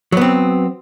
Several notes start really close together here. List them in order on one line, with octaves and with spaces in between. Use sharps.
F#3 B3 C4